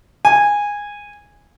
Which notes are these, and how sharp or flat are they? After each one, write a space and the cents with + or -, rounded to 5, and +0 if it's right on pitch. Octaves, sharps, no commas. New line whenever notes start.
G#5 -15